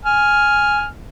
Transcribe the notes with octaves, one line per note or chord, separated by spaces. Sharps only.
G#5 F6